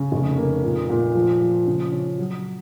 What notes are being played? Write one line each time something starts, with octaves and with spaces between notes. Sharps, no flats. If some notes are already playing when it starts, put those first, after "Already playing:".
Already playing: C#3
F1
A#3
A#2
A#2
F3
F3
C#3
C#4
F#3